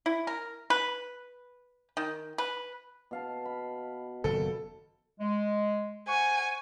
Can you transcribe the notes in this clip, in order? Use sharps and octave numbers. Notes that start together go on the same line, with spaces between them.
E4
A#4
B4
D#3
B4
B2 F5 A5
B5
F#1 B2 D#3 A4
G#3
C5 F#5 G#5 C#6